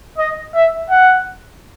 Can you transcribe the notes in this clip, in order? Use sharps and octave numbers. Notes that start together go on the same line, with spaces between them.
D#5
E5
F#5